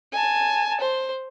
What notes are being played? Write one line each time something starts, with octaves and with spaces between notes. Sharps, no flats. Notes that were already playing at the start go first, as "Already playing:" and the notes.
G#5 A5
C5